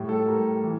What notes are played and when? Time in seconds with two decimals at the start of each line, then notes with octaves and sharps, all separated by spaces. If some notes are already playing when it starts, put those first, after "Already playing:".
Already playing: A2 G3
0.09 A4
0.26 A2 G3 A#4
0.64 E3